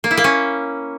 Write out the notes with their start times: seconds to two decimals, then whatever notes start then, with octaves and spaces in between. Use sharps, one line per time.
0.04 A#3
0.11 E4
0.17 A#3
0.24 C#4